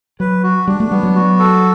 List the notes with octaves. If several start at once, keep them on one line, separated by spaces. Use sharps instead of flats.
F#3 B4
F#4
G3 D4
A3
G3 B3
F#3
F#4
A4